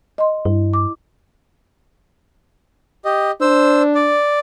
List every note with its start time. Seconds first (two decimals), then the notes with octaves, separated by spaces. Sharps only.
0.18 D#5 C6
0.45 G2 E4
0.74 D6
3.05 G4 D#5
3.41 D4 C5 E6
3.95 D5